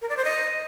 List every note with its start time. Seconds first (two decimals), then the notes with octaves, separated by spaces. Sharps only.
0.02 A#4
0.09 D5
0.17 C5
0.25 D#5